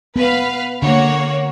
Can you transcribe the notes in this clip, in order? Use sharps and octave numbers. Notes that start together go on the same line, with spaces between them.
B3 B4 F5
D3 A#3 F#4 C#5